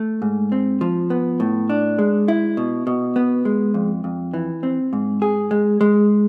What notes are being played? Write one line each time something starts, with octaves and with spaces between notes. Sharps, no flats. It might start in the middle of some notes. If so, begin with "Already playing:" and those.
Already playing: A3
G#2
C4
F3
B3
A2
D4
G#3
E4
B2
B2
B3
G#3
F2
F2
E3
C4
G#2
G#4
G#3
G#3